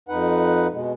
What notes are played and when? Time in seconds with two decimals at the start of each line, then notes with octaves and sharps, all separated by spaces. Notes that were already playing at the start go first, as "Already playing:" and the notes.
0.09 F2 D#4 B4 F#5
0.72 B2 G#3